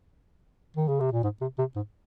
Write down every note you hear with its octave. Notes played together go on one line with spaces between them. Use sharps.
D#3
C#3
C3
A#2
G#2
C3
C3
G#2